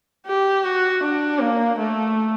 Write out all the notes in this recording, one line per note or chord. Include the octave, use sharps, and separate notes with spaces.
G4
F#4
D4
A#3
A3